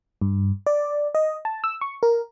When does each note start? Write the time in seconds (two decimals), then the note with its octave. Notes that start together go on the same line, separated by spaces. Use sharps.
0.22 G2
0.67 D5
1.15 D#5
1.45 A5
1.64 E6
1.81 C#6
2.03 A#4